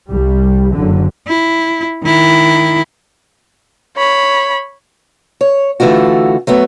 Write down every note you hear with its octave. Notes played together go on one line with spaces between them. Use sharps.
C2 G3
F#1 D3
E4
D#3 E4
C#5 B5
C#5
D3 E3 A3 F4 F#4
F#3 A3 B3